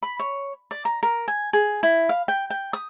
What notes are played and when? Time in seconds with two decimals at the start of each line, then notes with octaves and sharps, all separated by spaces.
0.03 B5
0.20 C#5
0.71 D5
0.85 A#5
1.03 A#4
1.28 G#5
1.53 G#4
1.83 E4
2.09 F5
2.28 G5
2.50 G5
2.73 D#6